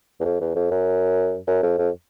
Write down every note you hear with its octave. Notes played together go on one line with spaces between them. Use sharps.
E2
F2
E2
F2
F#2
F#2
F2
F2